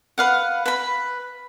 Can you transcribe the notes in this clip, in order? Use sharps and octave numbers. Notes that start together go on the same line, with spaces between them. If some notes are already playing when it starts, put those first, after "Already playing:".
B4 F5 F#5
B4 B5